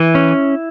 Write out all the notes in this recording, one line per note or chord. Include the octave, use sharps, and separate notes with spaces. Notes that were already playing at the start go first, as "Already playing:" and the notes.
Already playing: E3 E4
C#4